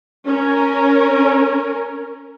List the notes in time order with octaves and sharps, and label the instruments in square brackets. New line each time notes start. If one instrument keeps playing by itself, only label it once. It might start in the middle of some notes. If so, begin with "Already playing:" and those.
[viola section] C#4 A#4